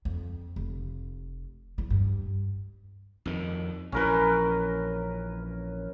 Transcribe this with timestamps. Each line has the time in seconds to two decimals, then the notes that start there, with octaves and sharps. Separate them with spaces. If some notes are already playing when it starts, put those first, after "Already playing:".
0.05 F2
0.56 F1
1.78 E2 E3
1.90 G2
3.26 F2 D#3
3.92 A#1 E3 C#4 A#4 B4